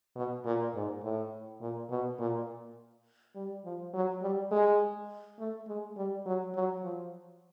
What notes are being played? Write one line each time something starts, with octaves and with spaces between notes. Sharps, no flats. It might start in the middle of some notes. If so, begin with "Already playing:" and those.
B2
A#2
G#2
A2
A#2
B2
A#2
G3
F3
F#3
G3
G#3
A3
G#3
G3
F#3
F#3
F3